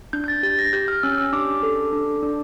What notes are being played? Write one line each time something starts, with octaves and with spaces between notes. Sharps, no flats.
D4 G6
G6
A6
G4 A6
A#6
G4 G6
F6
C#4 E6
E6
D4 D6
A4
D4
D4